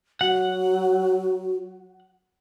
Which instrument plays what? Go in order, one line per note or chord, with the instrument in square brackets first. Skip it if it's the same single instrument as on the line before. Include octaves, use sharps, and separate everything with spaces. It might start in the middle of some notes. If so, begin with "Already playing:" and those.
[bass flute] F#3 [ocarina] F#4 [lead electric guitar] F#5